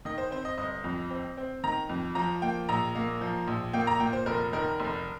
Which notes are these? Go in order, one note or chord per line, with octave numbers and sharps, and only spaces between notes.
D#3 D#5
C5
C4 C5
D#5
G1 D#5
F2
C4
C4
D#3 A#5
F2
F3 A#5
A#3 G5
A#1 A#5
A#3
F3
A#1
A#3 G5
A#5
A#2 G5
C5
F1 A#4
D#3 A#4
F1